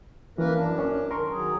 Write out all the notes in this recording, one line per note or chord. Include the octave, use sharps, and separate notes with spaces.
E3 A#3 C#4 A#4 B4
F#2 D4
C#4
D#3 A#4 C6 C#6
D#3 F#3 G#4